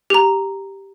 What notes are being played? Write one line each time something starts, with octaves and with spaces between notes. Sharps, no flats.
G4 A#5